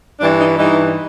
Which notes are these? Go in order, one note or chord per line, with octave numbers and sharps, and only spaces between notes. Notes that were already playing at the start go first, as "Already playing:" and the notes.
G2 E3 D4
D#4
G2 E3 D#4